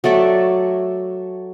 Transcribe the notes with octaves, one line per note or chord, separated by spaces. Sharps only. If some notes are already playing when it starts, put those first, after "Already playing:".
F#3 A3 D5 E5